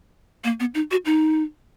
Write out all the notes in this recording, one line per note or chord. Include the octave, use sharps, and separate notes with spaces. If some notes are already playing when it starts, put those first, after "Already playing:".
A#3
B3
D#4
F#4
D#4